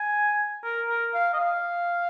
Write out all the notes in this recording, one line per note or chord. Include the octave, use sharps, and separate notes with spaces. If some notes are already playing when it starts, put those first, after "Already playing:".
Already playing: G#5
A#4
A#4
F5
D#5
F5